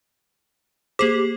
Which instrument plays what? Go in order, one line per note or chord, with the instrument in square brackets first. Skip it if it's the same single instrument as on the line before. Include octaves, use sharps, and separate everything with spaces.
[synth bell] A#3 G#4 C5 [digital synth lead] G4